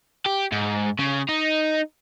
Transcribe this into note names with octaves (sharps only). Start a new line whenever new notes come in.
G4
G#2
C#3
D#4